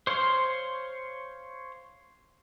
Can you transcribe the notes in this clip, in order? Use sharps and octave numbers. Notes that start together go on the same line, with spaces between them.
C5 C#5 F5 C6